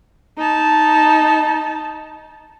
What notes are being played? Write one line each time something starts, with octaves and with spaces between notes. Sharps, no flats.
D#4 A5